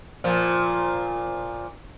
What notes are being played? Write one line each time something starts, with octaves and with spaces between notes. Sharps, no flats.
A#2 F3